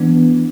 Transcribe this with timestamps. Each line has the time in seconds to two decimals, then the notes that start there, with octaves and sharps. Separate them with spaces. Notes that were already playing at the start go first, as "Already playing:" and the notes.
Already playing: E3 B3 D4